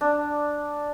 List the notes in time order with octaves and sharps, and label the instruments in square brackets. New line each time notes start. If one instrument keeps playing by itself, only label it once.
[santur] D4